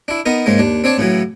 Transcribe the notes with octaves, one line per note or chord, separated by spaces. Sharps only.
D4 E4
B3 D#4 A#4
G#2 C#3 G#3 A#3
D#2 D4
C4 D4 C#5 D5 A5
A2 C#3 E3 F#3